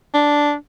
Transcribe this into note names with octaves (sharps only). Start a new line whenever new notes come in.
D4